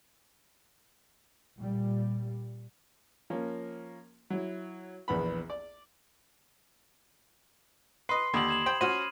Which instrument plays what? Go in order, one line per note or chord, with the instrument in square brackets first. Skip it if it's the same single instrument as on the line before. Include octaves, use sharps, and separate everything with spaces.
[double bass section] A#2 G3
[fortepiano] F3 A#3 C#4
F#3 E4
A#1 E2 B3 B5
D5
[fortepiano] B4 D#5 [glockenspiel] C6 C7
[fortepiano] D#2 D3 [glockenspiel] B5 D#6 F#7
[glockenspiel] G#6 E7 F#7
[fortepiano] C5 G5
[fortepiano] C#4 F#4 C5 [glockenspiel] F6 D#7